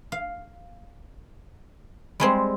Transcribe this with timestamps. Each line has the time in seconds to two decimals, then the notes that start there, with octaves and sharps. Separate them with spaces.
0.12 F5
2.20 G3 G#3 C4